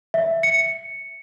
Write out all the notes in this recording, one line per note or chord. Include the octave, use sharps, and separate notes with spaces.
E5
C#7